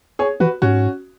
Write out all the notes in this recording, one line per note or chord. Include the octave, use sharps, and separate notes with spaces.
G#4 C#5
E3 F#4 B4
G#2 C#4 F#4